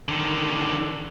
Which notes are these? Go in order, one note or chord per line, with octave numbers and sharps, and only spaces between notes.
D3 D#3